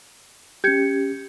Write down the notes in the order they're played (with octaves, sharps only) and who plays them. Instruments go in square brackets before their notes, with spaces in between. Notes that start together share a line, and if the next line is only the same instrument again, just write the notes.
[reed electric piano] C#4 G4 [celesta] G6 G#6 C#7